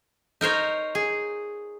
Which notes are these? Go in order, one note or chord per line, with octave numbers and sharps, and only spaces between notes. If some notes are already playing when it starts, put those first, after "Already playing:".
D#4 A#4 C5 C#5
G#4